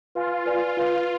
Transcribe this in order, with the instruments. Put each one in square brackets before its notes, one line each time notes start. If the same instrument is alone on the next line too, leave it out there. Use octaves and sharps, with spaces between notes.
[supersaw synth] F4 [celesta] B4 F5 G#5
[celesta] B4 D5 G#5
F4 B4 F5